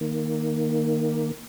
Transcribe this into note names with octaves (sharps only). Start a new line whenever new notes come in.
D#3 A#3